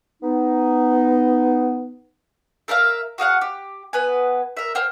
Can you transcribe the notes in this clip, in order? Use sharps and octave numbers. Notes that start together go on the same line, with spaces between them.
B3 D#4
A4 A#4 E5 F5
F#4 G#4 F5 F#5
G4
B3 B4 G#5
A#4 E5
C5 F5 G5